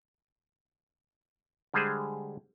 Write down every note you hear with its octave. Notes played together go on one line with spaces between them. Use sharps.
D3 G3 G#3 G#4 C5